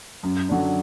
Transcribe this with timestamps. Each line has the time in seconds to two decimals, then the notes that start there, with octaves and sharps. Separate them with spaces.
0.23 F#2
0.49 D3 F#3 D4